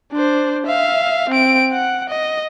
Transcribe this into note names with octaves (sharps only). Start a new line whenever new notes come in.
D4 C5
E5 F5
C4 D7
F#5
D#5